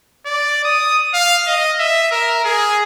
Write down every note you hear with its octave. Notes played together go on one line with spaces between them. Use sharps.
D5
D#6
F5
D#5
E5
A#4
G#4